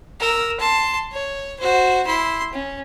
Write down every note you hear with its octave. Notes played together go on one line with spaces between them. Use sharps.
A#4 E6
A5 C6
C#5
F#4 C5
E4 C6
C#4